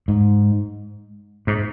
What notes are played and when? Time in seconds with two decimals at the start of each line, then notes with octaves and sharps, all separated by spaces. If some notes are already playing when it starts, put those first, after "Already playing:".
0.08 G#2
1.47 G#2